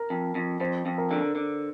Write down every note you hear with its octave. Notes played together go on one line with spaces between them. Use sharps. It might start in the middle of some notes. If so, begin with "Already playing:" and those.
Already playing: A#4
F2
F2
F2 C5
F2
A#4
D3
D3